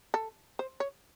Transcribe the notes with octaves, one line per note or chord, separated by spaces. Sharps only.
A4
C5
C#5